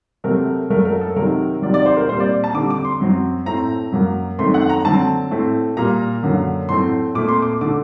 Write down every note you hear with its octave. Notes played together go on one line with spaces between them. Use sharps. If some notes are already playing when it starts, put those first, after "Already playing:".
C3 F#3 A3 C4 A#4
F#2 F#3 A3 A#4
A#4
A4
C3 D#3 F#3 A#4
C3 D#3 F#3 D5
D5
C5
A#4
A#2 G3 C4 C5
D5
A5
D3 G3 C4 D6
D6
C6
F#2 F#3 C4
A2 A3 C4 A#5
F#2 F#3 A#3
F#2 D#3 A3 C4 C6
F#5
A#5
D3 F#3 C4 A5
A2 A3 C4
A#2 G3 A#3 A#5
F#2 D3 F#3 A#3
A2 F#3 A3 C4 C6
A#2 A3 C4 D6
C6
D6
D3 A3 D6